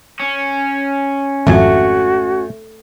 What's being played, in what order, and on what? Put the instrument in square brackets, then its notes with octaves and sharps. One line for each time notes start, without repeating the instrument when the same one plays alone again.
[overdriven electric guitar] C#4
[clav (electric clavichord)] G#1 F2 G#5 [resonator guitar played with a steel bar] A3 [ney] F#4